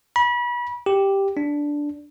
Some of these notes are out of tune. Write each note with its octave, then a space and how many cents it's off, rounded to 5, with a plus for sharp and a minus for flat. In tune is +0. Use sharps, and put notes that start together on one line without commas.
B5 -30
G4 +0
D4 -5